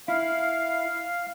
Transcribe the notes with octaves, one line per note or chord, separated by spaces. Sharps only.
E4 F5